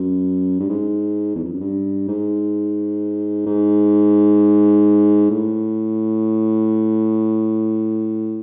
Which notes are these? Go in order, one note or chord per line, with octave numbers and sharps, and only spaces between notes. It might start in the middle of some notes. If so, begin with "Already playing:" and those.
Already playing: F#2
G2
G#2
E2
F2
F#2
G2
G#2
G#2
A2